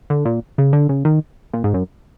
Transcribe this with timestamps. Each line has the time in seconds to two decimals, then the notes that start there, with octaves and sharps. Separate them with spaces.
0.10 D3
0.25 A#2
0.58 C#3
0.73 D3
0.89 C#3
1.05 D#3
1.53 A#2
1.64 G#2
1.74 F#2